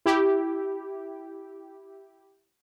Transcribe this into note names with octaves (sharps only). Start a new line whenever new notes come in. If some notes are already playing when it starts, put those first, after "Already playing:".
E4 G4